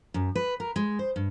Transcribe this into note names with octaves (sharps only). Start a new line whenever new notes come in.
F#2
B4
A#4
G#3
C5
G2